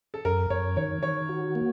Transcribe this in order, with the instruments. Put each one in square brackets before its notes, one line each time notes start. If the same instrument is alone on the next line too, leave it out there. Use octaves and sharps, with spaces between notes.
[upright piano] A4
[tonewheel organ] F#2 [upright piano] A#4
[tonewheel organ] F#2 [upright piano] C#5
[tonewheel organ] D#3 [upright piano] C#5
[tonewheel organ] D#3 [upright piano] C#5
[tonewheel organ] F#4
A#3